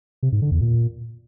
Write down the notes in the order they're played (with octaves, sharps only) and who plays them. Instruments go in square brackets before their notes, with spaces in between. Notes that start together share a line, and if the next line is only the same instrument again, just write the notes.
[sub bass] C3
G#2
D3
E2
A#2